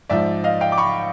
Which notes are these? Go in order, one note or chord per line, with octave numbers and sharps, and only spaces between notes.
G#2 F3 D5 E5
D#5 F5
F5 G5
D6
B5 C#6